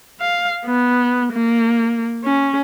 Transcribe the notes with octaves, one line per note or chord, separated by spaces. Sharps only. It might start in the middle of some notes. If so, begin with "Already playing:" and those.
F5
B3
A#3
C#4